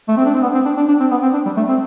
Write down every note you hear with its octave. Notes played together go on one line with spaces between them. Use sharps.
A3
C4
D4
C4
B3
C4
D4
D4
D4
C4
B3
C4
D4
G3
A3
C4